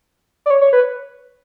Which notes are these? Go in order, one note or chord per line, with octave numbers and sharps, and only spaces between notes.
D5
C#5
C#5
B4